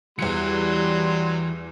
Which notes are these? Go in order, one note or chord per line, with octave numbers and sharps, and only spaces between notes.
E2 E3 F#3 G3 C6 C#7